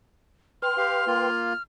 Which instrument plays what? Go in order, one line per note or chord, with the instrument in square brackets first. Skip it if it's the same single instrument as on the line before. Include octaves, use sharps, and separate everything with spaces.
[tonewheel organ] B4 G5 C6 [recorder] F6
[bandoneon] G4 F5
A#3 F4